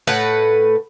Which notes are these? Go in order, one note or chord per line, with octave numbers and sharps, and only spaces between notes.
A2 B4 F#5